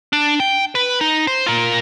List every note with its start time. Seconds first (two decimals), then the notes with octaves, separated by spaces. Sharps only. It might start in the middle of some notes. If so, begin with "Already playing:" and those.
0.13 D4
0.40 G5
0.75 B4
1.01 D#4
1.27 C5
1.47 F4 A#4